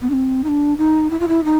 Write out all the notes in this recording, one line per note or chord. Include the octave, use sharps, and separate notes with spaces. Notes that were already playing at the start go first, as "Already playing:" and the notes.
B3
D4
C4
D#4
D4
D#4
E4
F4
E4
D#4